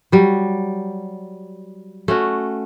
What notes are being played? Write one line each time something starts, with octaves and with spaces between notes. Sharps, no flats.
F#3 G3
A3 C#4 F#4